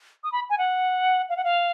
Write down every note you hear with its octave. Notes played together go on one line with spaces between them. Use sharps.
D#6
B5
G#5
F#5
F5
F#5
F5